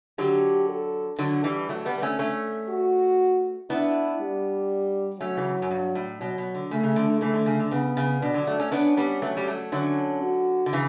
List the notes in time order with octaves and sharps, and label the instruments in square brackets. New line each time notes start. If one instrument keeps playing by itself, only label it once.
[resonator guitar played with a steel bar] D3 F#3 [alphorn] G4
[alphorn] A4
[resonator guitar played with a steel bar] D3 F#3
E3 G3
F#3 A3
G3 B3
B3
A3 C#4
A3 C#4
[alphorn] F#4
[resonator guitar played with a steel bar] B3 D4 [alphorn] E4
[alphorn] G3
[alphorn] F#3 [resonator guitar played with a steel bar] A3 C#4
[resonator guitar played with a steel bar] C#3 E3
F#2
G2
A2
[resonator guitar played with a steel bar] B2 [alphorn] F#3
[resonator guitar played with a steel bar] B2
D3
[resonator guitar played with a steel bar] C#3 [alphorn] A3
[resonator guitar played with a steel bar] C#3
D3
D3
[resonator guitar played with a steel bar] C#3 E3 [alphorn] A3
[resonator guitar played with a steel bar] D3
C#3
D3
[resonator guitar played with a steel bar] C#3 [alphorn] B3
[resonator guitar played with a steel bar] C#3
[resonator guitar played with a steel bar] B2 [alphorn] D4
[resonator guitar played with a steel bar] D3 F#3
F#3 A3
A3 C#4
[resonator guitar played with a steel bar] B3 D4 [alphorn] C#4
[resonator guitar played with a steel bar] G3 B3
F#3 A3
G3
F#3 A3
[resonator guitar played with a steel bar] D3 F#3 [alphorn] C#4
[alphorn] F#4
[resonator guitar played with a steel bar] D3
C#3 E3